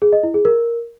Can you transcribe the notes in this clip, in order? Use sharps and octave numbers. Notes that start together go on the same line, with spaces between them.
G#4
D#5
E4
G#4
A#4